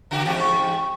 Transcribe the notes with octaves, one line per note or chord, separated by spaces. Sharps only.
C#3 F#4 G4
E2 G#2 F#4 G4
C#6